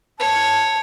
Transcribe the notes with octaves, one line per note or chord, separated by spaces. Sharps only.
C#5 A5